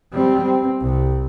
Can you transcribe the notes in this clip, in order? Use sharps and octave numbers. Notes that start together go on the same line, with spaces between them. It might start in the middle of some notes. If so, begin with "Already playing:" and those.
G3 C4
C4
C2